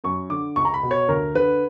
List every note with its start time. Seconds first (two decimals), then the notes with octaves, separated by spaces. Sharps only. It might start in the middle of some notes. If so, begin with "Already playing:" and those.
0.04 F#2 C#6
0.30 D3 D6
0.56 C#2 C#6
0.65 A#5
0.74 B5
0.83 B2
0.91 C#5
1.08 D2 A#4
1.35 D3 B4